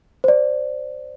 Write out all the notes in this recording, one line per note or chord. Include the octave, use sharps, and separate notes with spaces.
C5 D5